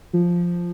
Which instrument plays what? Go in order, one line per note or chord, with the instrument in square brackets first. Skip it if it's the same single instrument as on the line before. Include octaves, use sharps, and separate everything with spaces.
[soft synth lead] F3